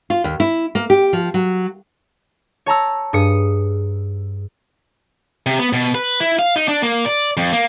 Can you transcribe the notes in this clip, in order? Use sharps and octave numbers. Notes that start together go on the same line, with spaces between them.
F4
D#2
E4
A#3
G4
F3
F#3
C#5 A5 A#5 E6
G2 G#4 D#6 C#7
C3
B3
B2
B4
E4
F5
D#4
D4
A#3
D5
F2
A#3